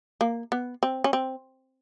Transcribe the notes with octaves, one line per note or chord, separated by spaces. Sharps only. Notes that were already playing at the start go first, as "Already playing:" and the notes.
A#3
B3
C4
C#4
C4